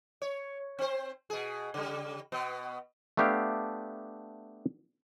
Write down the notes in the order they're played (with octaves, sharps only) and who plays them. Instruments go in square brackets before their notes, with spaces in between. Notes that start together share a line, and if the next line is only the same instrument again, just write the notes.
[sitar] C#5
C4 C5
B2 G#4
C#3 G3
B2 B3
[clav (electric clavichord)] A3 B3 D4 G4 E5 F5